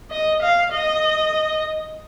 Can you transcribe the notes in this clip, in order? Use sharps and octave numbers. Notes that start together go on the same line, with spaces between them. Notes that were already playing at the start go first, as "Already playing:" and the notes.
D#5
F5
D#5